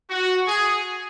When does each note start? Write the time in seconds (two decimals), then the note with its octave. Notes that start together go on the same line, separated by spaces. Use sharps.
0.10 F#4
0.47 G#4